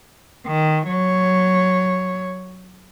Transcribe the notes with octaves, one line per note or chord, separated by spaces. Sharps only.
D#3
F#3 C#5